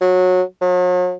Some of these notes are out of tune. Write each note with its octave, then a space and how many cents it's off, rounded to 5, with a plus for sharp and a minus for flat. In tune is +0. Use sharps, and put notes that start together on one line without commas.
F#3 -20
F#3 -45